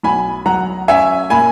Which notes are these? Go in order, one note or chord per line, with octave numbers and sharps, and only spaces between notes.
B1 G#5 B5
F#3 F#5 A#5
C#4 E5 G#5
A#2 G#5 B5